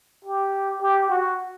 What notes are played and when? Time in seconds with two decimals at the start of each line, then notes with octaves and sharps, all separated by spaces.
0.25 G4
0.81 G4
1.09 F#4